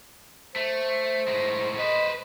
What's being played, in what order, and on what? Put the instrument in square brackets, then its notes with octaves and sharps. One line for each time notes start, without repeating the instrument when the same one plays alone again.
[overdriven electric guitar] A3 [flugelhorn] C5
[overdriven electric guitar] A2 G#3
[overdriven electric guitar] B4 C5 [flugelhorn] D#5